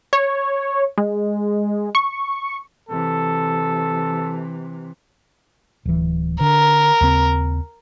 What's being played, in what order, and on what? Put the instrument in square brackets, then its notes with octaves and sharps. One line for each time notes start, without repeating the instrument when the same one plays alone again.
[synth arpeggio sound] C#5
G#3
C#6
[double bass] C3 E3 [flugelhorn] A4
[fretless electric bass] D1 E3
[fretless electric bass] D3 [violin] A#4
[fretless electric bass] D#2 C#3 C4